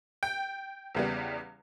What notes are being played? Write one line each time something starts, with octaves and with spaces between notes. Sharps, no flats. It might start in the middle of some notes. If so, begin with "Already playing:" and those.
G5
E2 C#3 G3 B3